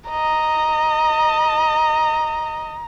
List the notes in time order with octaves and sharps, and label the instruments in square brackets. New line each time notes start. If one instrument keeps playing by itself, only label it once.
[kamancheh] D#5 [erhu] A#5